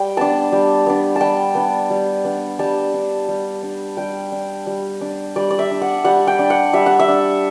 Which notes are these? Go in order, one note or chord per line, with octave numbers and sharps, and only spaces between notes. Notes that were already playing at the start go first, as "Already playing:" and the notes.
Already playing: G3 G5
B3 D4 A5
G3
B3 D4
G3 G5 A5
B3 D4
G3
B3 D4
G3 A5
D4
G3
D4
G3 G5
D4
G3
D4
G3 D5
D5
E5
D4
F#5
G3 F#5
G5
D4
F#5
G3 E5
F#5
E5
D4